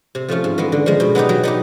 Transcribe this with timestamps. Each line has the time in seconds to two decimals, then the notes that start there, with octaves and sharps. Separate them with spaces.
0.15 C3
0.28 F3 A3 C#4 F4
0.44 G#2
0.58 E3 G#3 B3
0.72 D3
0.86 F3 G#3
1.00 B2
1.15 F#3 B3 D#4 G4
1.29 F#3
1.43 B3 D#4 G4